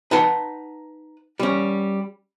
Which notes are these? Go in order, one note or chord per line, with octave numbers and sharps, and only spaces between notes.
D#4 B4 F#5 A5
G3 C#4